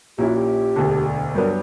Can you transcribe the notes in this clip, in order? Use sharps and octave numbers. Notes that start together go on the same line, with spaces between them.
A#1 A#2 A#3 C#4 E4 G4
F#4
G4
E1 D2 D3
G2 F#3 B3 D4 A#4